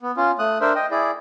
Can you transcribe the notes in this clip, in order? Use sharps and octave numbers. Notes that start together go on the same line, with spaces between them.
B3
C#4 F4
A3 D#6 F#6
D4 A#4 C5 E5
D#5 G5
E4 G#4 D5